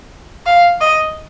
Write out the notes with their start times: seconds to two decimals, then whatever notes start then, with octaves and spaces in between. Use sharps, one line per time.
0.46 F5
0.81 D#5